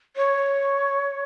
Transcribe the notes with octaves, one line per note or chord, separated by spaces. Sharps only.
C#5